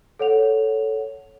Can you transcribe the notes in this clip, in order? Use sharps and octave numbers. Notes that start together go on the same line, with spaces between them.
A4 C#5 F#5 F7